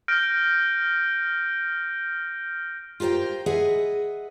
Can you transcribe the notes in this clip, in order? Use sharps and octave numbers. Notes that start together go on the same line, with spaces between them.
F6 G6 A#6 D7
F4 G4 A#4 C5 G5
G#4 B4 D#5 E5 F#5